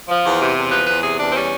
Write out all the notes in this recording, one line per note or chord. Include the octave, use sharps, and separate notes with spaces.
F3
E2
C3
E2
F3 B4
E2 B4
C3 G#4
E2 D4
C4
G3 C#4